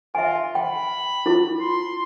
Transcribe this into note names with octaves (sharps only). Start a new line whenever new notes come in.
F4 E5 G#5
G5 B5
E4 F4
C6